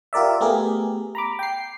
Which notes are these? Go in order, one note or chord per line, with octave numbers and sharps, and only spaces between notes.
F4 G4 A#4 D5 E5
A3 B3 G4 G#4 A#4
A#5 B5 D6
G5 C7